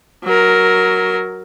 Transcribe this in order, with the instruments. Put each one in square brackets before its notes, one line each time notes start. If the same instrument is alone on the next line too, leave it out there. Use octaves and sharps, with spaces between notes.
[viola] F#3 A#4